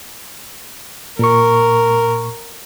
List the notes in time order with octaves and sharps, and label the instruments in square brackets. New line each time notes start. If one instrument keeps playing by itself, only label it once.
[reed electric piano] A#2 C#6 [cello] A#4